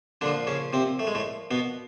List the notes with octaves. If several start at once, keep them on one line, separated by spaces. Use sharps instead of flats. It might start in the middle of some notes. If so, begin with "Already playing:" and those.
A#2 D3 F3 D4
C#3 C#4
C3 C4
A3
G#3
A2 A3
B2 B3